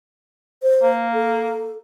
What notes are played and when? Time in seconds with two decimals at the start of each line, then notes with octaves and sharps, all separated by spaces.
0.63 C5
0.82 A#3
1.14 A4